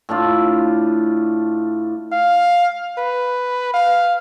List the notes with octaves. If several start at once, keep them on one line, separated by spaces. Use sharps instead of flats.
A2 D4 F4
F5
B4
F5